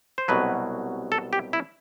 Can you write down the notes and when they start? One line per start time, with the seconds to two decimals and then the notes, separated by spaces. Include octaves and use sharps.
0.18 C5
0.28 C2 B2 F#3 B4
1.12 A4
1.33 G4
1.53 E4